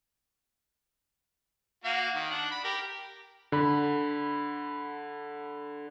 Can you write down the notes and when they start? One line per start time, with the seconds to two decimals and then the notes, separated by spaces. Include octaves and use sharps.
1.84 A#3 F#4 F5
2.15 D#3
2.30 D4 F#5
2.51 B5
2.64 G4 A#4
3.52 D3 B5